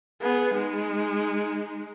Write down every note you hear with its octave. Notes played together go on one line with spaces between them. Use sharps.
B3 G#4
G#3 D#4